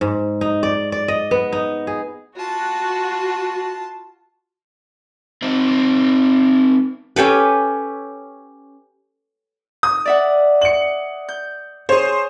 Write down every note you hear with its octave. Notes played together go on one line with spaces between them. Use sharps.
G#2
D#4
D5
D5
D#5
B3
D#4
G#4
F4 F#4 A5
C4 D#4
C#4 G4 A4 B4
D#6
D5 E5 F#5
C#7 F#7
G6
G#4 C5 C#5